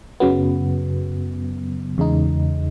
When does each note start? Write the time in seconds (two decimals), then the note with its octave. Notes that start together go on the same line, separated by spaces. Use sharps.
0.20 F#2 C#3 F#3 B3
1.98 E2 C#3 G#3 D#4